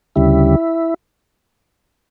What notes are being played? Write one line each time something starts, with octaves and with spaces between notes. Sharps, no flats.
D2 C#3 G3 E4